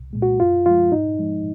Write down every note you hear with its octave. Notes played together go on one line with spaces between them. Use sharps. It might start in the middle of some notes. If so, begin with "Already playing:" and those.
Already playing: C2
A#2 G#3
F#4
F#2 F4
F3 G#3 F4
G#2 D#4
F3 G#3